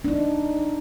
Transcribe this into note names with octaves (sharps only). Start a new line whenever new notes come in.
D4 D#4